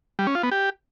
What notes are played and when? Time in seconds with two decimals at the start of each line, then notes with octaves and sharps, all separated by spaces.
0.19 G3
0.27 C#4
0.35 F4
0.43 B3
0.52 G4